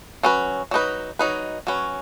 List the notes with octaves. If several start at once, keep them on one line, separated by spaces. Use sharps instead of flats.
F#3 C#4 B4
F#3 D#4 B4
F#3 D#4 B4
F#3 C#4 B4